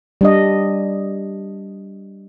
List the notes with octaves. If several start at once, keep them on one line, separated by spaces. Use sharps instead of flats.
G3 D4 D#5